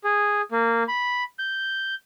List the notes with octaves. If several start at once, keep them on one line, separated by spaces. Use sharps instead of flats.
G#4
A#3
B5
G6